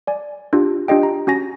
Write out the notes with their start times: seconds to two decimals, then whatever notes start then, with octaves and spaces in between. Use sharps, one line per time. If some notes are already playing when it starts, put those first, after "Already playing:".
0.07 D5 G#5
0.53 D4 F4 G4
0.88 D4 F4 G4 D#5 G5
1.03 A#5
1.27 C#4 F#4 G#5 A#6